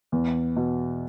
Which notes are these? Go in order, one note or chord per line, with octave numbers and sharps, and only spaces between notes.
E2
B2